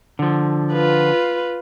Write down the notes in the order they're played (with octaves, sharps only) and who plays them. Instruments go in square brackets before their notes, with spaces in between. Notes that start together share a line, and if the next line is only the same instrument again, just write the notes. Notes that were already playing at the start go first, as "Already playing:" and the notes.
[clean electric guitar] D3 F3
[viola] F4 B4